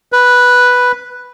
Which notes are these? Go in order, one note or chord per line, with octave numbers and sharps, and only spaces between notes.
B4